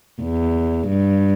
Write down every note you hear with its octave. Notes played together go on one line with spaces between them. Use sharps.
E2
G2